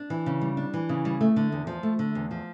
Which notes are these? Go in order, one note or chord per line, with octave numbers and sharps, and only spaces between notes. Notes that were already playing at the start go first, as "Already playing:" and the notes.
Already playing: D4
E3
C#3
G3
D4
E3
C#3
G3
A3
D3
E2
F3
A3
D3
E2
F3